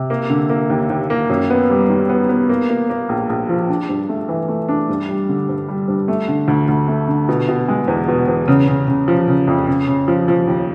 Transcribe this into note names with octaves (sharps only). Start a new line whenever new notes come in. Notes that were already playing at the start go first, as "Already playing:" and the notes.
Already playing: C3
A#3
D3
A#3
D#2
D#2
A#3
F#2
B3
G3
D#3
B3
B3
A#3
A#3
A#3
A#1
A#1
F3
D4
G2
A3
E3
A3
D4
G2
G3
D3
G2
G3
G2
A3
D3
D2
D2
A3
D3
B2
B2
G#3
E2
B2
E2
C#3
C#3
C#3
F3
C#3
F2
C#3
C#3
F3
F3
D#2